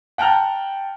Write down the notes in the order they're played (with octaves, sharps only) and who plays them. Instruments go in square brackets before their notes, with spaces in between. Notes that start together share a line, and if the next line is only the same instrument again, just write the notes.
[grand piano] F#5 G5 A5 A#5 F6